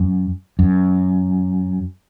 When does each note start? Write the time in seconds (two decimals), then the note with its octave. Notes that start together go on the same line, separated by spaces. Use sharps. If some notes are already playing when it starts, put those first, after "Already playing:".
Already playing: F#2
0.59 F#2